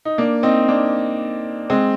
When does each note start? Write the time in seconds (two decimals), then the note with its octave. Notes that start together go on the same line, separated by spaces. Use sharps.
0.05 D#4
0.18 A#3 D4
0.43 C4 D#4
0.68 A#3 D4
1.70 G#3 C4